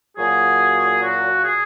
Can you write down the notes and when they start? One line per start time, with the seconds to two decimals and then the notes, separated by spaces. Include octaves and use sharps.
0.17 A#2 F#3 G#4
1.01 F#4
1.43 G#4